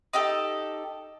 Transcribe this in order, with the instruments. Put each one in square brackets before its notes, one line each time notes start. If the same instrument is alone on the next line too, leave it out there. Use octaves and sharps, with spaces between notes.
[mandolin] D#4 G4 A4